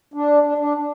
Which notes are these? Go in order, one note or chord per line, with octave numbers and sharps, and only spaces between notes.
D4
D4
D4